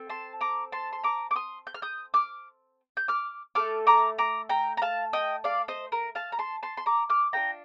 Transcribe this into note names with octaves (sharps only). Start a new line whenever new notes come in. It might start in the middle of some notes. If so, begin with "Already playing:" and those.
Already playing: C4 A4
A5 C6
A#5 D6
A5 C6
C6
A#5 D6
D6
C6 D#6
G6
F6
D#6 G6
D6 F6
G6
D6 F6
A3 D#4 A4 D6 F6
A#5 D6
A#5 D6
G5 A#5
A#5
F5 A5
D#5 G5
D5 F5
C5 D#5
A#4
F5 A5
A#5
A5 C6
A5 C6
C6
A#5 D6
D6 F6
D4 F4 A4 G5 A#5